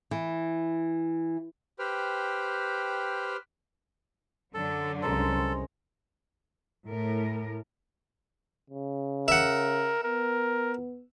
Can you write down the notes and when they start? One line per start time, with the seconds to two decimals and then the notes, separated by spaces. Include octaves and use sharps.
0.11 E3
1.79 G4 B4 C5 G5 F6
4.54 F#2 D3 F#3 A4
5.02 C2 G#3 C#4 A4 A#4 C5
6.88 A2 A#4
8.70 C#3
9.28 A#4 E5 F#5
10.04 B3 A#4